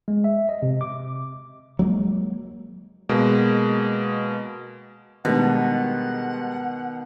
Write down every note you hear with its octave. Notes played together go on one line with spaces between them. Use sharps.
G#3
E5
D#5
C3
D6
F#3 G#3 A#3
B2 G#3 A#3
B2 D#3 G3 G#3 D4 F#5